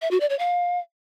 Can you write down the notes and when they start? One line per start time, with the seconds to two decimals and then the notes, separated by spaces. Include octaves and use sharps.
0.02 E5
0.11 F#4
0.20 D5
0.30 C#5
0.39 F5